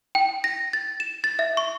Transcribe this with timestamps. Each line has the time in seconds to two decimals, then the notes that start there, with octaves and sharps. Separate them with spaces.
0.15 G5
0.44 A#6
0.73 A6
1.00 E7
1.24 A6
1.39 E5
1.57 C#6